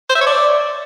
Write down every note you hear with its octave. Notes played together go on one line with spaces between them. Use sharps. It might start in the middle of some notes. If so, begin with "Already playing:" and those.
C5
E5
C#5
D5